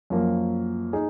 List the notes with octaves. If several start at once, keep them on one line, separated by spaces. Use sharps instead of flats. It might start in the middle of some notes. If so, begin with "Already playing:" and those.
F#2 F3 A#3
D#4 G#4